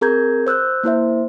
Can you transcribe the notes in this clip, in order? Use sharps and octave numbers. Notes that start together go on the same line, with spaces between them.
C4 G#4 A#4 A#5 G6 G#6
C5 E6 F#6 G6
A#3 E4 C5 E5